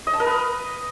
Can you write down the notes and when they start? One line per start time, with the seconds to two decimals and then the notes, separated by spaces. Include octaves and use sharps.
0.07 D#5
0.13 A5
0.20 A#4
0.26 B4